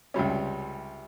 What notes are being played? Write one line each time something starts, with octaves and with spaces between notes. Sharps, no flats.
C#2 C3 G3 C#4